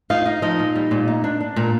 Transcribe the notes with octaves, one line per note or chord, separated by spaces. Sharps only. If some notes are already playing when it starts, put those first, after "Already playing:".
D#4 F4 F5
D#4
F3 D#4 D#5
A#2
G3
A#2
D#4
D4
D4
A#2